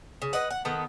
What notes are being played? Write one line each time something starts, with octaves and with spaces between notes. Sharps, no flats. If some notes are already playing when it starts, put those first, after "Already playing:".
C#3
B4 D#5 F#5
F#5
D#3 B3 A4